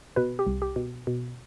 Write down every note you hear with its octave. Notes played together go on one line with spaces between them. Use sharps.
B2 B4
G4
C2
G4
B2
B2